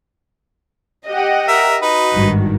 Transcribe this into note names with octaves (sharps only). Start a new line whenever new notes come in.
G4 D#5 F#5 G5
A#4 E5
D#4 F#4 B4
G#1 G2 D#3